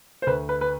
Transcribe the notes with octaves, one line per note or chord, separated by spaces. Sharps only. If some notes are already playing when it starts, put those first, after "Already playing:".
C5
D2 B4
B4
B4